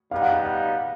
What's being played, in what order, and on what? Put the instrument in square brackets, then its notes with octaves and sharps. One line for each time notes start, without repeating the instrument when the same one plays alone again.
[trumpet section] G3 B3 D#4 G4 [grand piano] F5
[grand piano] F#5
F5
F5